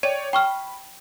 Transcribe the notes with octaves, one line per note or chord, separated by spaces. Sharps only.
C#5 D5 G5 D#7
G5 B5 C#6 F6